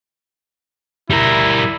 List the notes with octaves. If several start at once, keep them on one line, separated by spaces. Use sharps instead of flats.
G3 E4 A#4